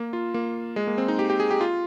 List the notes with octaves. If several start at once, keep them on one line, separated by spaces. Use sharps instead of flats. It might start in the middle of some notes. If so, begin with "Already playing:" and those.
Already playing: A#3
F4
A#3
G#3
A#3
C4
D#4
G4
G4
G#4
G4
F4